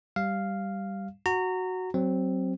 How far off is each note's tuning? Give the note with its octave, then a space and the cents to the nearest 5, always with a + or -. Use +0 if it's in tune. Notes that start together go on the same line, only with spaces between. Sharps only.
G3 +0 F5 -5
F#4 +0 A#5 -25
F#3 +25 C4 +0